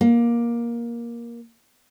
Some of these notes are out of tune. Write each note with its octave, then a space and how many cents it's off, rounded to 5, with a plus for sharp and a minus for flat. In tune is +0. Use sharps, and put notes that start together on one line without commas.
A#3 +15